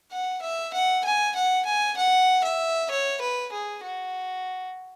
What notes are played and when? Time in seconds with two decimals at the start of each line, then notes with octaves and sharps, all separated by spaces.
0.12 F#5
0.42 E5
0.73 F#5
1.04 G#5
1.36 F#5
1.66 G#5
1.97 F#5
2.44 E5
2.91 C#5
3.21 B4
3.52 G#4
3.83 F#4